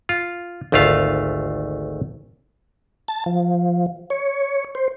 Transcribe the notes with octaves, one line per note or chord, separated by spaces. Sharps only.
F4
G#1 D2 A3 F4 F5
A5
F3
C#5
C5